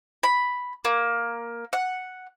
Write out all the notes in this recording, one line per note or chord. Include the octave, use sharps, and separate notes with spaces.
B5
A#3
F#5